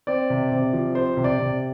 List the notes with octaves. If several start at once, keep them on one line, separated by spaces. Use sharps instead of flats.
C4 D5
C3
C3
F3
C4 C5
C3
D5
C3